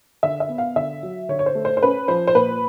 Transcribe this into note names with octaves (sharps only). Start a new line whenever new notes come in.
D3 E5
E5
B3
F5
D3 E5
F#3
D3 C#5
C#5
C5
A3
C5
C5
C#4 B4
F3 C5
C5
A#2 B4